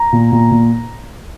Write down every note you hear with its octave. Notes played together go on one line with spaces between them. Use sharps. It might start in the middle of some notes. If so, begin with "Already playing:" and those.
Already playing: A#5
A#2
A#2
A#2